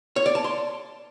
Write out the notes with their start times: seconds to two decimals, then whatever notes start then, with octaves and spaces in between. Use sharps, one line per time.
0.16 C#5
0.26 D5
0.35 A5
0.44 C6